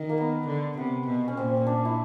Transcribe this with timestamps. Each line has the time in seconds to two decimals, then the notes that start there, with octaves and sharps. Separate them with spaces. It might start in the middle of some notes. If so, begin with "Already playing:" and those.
Already playing: D#3
0.09 A#3
0.18 B3
0.47 D3
0.77 C3 B3
1.07 B2
1.28 C#4
1.37 A#2 C4
1.57 C#4
1.67 D4
1.85 E4